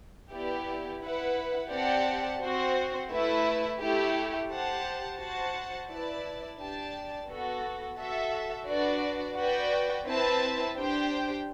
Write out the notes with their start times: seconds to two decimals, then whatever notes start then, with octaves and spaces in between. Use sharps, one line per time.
0.32 B3 E4 G4 D5
1.01 E4 B4 F#5
1.71 C4 G4 D5 F#5 A5
2.41 C4 F#4 C5
3.10 A3 E4 B4 E5
3.80 A3 E4 G4
4.50 G4 C5 F#5 A5
5.19 F#4 C5 F#5 A5
5.89 E4 B4 D5 A5
6.58 D4 G4 D5 A5
7.28 B3 F#4 A4
7.98 F#4 A4 E5
8.67 D4 F#4 B4 D5
9.37 F#4 B4 D5 G5
10.07 C4 E4 B4 E5 A5
10.76 D4 G4 C5 G5